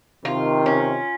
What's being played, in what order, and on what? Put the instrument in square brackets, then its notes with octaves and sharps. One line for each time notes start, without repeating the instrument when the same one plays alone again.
[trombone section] C3 D#3 [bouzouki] F4
[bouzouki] C#4